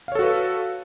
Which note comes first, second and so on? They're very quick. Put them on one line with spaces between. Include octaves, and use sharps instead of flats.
F5 C#5 A4 F#4 B4